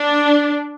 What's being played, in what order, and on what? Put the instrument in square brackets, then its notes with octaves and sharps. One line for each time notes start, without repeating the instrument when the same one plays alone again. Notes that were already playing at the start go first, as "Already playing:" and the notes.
Already playing: [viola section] D4